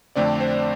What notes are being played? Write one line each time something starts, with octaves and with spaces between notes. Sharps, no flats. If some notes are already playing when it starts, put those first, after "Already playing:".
F2 D3 A3 C4 D5
C5